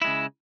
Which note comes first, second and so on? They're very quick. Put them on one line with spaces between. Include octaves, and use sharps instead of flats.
E4 G#3 C#3